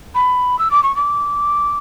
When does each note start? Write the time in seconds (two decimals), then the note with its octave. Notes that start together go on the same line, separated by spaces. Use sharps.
0.14 B5
0.58 E6
0.70 D6
0.83 C#6
0.95 D6